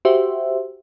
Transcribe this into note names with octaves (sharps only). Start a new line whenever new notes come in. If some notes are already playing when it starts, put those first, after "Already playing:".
F#4 G4 C5 E5